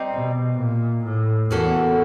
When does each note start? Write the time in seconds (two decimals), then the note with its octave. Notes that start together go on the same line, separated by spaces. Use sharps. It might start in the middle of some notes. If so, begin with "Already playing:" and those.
Already playing: G3 C4 D#4
0.12 B2
0.58 A#2
1.04 A2
1.51 E2 A#3 C#4 F#4 A4